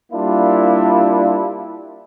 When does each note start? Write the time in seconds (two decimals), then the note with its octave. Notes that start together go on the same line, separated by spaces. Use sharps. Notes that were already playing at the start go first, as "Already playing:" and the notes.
0.12 G3 A#3 D4 E4 F4